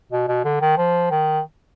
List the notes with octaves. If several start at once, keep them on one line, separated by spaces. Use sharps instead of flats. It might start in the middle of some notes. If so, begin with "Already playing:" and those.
B2
B2
D3
D#3
F3
D#3